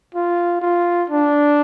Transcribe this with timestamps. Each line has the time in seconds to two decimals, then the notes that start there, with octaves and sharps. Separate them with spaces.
0.15 F4
0.62 F4
1.10 D4